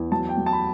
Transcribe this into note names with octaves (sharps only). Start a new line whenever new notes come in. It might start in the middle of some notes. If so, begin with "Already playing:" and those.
Already playing: E2
F#3 A5
G5
F#3
A5
B5